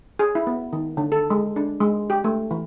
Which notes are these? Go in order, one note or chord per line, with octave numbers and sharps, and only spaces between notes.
G#4
E4
B3
D#3
D3
A4
G#3
D4
G#3
G4
A3
E3